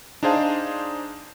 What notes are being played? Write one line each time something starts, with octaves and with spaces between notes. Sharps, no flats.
D4 D#4 G#4 C5 F5 A5